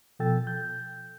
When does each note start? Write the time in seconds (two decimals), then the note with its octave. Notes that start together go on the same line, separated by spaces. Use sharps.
0.19 B2 F3 A4 G5 E6 A6
0.47 G6